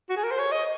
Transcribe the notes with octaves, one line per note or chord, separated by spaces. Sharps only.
F#4
G#4
A#4
C5
C#5
D#5